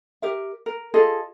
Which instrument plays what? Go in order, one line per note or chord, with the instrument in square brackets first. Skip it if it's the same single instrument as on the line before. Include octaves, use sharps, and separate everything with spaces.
[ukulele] G4 A#4 E5
A#4
F4 G#4 A4 D#5